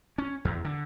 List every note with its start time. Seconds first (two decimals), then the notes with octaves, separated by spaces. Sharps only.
0.18 C#4
0.45 E2
0.65 D3